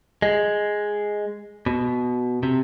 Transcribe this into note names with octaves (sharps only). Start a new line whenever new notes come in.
G#3
B2
C3